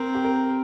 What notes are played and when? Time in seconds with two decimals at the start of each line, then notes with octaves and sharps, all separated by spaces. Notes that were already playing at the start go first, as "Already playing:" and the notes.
Already playing: C4 A#4
0.15 G4
0.25 A#4